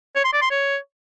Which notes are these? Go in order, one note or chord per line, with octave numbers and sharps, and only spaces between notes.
C#5
C6
D5
C6
C#5